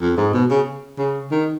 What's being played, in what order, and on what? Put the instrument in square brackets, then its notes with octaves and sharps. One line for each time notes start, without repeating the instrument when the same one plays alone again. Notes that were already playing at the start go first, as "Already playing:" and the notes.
[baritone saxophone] F2
G#2
B2
C#3
C#3
D#3